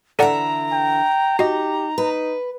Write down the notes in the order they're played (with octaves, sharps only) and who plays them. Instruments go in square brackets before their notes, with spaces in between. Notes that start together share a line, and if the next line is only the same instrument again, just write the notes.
[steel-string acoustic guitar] D3 E3 E5 [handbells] A4 D5 F#5 [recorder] A#5
[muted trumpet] G5
[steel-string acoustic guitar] D#4 [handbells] F#4 D#5 [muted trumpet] G4
[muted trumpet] D#4 [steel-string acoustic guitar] B4